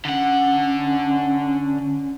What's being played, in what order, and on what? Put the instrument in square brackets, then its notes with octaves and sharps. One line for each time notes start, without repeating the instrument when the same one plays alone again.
[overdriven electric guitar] D3 F#5 [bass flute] C#4